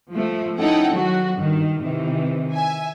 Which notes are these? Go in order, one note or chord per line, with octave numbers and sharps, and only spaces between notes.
F3 A3
C#4 D#4 E4 A4 F#5 G5
D#3 F#3 F#4
G2 D#3
C3 D#3 E3
E5 G#5